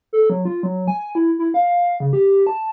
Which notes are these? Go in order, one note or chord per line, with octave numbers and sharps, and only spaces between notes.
A4
F#3
F4
F#3
G#5
E4
E4
F5
C#3
G4
A5